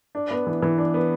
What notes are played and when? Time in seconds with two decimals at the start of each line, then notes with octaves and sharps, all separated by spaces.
0.15 D4
0.31 B3
0.47 E3
0.62 E3
0.78 D4
0.94 B3